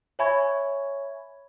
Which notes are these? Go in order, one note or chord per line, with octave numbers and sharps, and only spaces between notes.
C#5 E5 G#5 B5 C#6 G#6